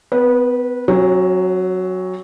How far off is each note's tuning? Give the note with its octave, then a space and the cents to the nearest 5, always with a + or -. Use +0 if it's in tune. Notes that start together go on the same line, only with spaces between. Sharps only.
B3 +40 B4 -20
F#3 +0 C#4 -45